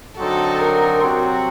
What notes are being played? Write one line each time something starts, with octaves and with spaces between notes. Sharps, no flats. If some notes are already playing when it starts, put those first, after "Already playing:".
D3 F#3 C4 D#4 F#4 A4
A#4
C3 F#3 C4 F#4